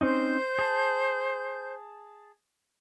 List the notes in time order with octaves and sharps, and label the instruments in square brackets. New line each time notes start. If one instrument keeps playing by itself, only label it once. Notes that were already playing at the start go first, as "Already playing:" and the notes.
[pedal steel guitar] C4 C#4 D#4 [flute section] C5 G6
[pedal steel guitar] G#4 A5